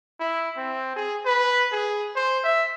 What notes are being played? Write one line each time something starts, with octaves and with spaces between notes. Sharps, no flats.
E4
C4
G#4
B4
G#4
C5
E5